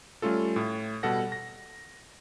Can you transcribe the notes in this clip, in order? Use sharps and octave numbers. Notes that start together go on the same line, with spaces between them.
G3 A3 C#4 F4 A4
A2
B2 G3 A4 F#5 A#6
A#6